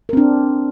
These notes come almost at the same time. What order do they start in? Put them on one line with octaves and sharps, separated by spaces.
A#4 C4 D4